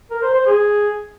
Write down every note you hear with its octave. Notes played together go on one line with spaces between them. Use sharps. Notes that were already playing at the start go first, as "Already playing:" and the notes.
A#4
C5
C5
G#4